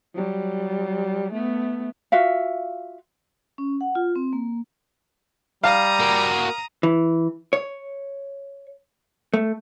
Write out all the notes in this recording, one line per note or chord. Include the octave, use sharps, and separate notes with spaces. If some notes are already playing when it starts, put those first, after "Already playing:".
F#3 G3
A3 B3
F4 F#4 E5 F5
C#4
F#5
F4
C4
A#3
G3 F5 A#5 D#6
A#3 F#4
E3
C#5
A3